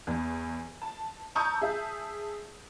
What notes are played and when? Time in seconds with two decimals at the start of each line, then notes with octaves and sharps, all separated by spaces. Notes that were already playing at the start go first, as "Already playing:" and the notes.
0.07 E2
0.82 A5
1.35 A5 A#5 C#6 D#6 E6 G6
1.61 G#4 E5 A5